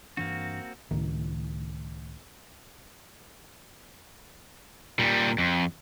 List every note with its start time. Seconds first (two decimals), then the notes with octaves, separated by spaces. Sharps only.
0.17 G2 E3 A#3 C4 D4 F#4
0.91 C#2 A2 D#3
4.99 A#2 G3
5.38 F2